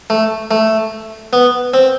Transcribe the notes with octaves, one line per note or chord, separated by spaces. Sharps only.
A3
A3
B3
C4